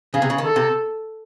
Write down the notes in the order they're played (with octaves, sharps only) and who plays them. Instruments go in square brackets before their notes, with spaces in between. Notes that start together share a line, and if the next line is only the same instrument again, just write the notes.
[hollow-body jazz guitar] C#3 [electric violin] G#4
[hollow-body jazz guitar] C3
C#3
D#3
[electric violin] A4
[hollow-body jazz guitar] C3